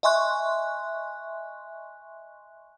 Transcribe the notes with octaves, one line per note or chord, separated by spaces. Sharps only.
D#5 E5 G#5 C6 C#6 F#6